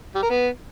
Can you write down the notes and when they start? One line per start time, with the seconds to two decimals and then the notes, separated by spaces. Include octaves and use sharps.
0.15 G3
0.22 A#4
0.30 B3